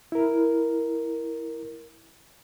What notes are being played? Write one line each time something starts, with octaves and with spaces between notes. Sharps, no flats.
E4 A#4